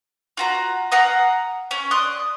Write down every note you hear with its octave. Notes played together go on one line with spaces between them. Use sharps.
F4 F#4 A#5
F5 F#5 A#5 D#6
C#4
D5 C6 D#6 F#6